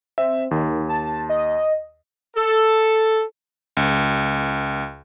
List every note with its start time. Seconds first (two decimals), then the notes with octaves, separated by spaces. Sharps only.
0.18 C4 E5
0.51 D#2 D#3
0.89 A5
1.29 D#5
2.37 A4
3.77 C#2